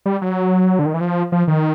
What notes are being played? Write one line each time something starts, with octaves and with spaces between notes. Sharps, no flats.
G3
F#3
D3
D#3
E3
F3
F3
D#3